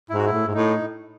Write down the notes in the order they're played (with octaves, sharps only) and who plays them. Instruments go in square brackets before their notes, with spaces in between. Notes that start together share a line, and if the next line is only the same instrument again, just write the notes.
[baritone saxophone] G#2 [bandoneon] E4
[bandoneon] F#4
E4
[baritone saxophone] A2
G#2
[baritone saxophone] A2 [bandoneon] D#4